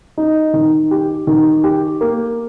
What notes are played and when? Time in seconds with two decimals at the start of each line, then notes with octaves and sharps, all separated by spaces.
0.18 D#4
0.54 D#3
0.91 G4
1.27 D#3
1.64 G4
2.01 A#3